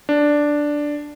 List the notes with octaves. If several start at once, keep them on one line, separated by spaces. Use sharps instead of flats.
D4